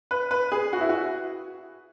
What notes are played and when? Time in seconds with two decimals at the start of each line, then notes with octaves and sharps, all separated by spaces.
0.11 B4
0.31 B4
0.52 G#4
0.73 F#4
0.81 E4
0.89 F#4